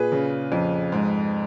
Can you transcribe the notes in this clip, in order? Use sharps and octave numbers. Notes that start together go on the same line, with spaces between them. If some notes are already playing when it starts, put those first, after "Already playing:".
Already playing: A#2 G#4 B4
C#3
F2
G#2